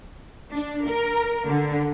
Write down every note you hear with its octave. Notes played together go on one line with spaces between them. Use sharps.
D4
A#4
D3